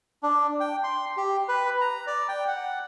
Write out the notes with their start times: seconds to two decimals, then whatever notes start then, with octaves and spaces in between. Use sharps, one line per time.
0.23 D4
0.60 G5
0.84 C6
1.17 G4
1.48 B4
1.81 A#5
2.07 D5
2.29 G5
2.47 F#5